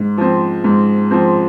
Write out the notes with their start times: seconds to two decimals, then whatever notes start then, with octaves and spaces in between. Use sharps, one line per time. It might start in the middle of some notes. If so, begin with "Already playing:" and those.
Already playing: G#2
0.18 F3 C4
0.64 G#2
1.11 F3 C4